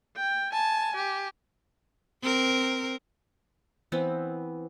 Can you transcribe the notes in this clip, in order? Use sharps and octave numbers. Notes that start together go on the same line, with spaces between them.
G5
G#5 A5
G4
C4 A#4
E3 B3 C4 E4